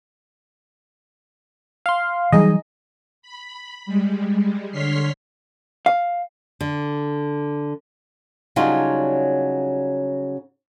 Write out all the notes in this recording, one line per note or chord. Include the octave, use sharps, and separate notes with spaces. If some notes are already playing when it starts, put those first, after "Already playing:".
F5 C6
E3 F#3 G3 D#4 G#4 D#5
B5
G3 G#3
D3 C#5 C6 F6 B6 C7
F5
D3
C#3 F#3 G3 D4 D#4 F4